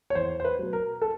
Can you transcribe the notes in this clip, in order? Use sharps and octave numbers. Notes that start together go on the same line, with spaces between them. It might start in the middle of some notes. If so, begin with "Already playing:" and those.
C#5
E2 C5
C5
B4
B2 F#3
A#4
A4